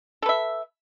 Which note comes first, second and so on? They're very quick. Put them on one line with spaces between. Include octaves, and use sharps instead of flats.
A4 B4 E5